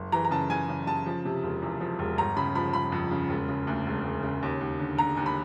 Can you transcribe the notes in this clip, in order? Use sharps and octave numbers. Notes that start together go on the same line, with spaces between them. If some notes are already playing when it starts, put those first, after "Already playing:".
Already playing: F#1
E3 A#5
A#5
C#3 A5
C#3 G#5
C#3
C#3 A5
F3
C3
E1
E2
F3
E1
G1 A#5
C#3 B5
F3 B5
C#3 B5
F2
C#3
E1
C#3
D2
E1
E1
C#3
D#2
D#2
D3
D3 A#5
D#2
B5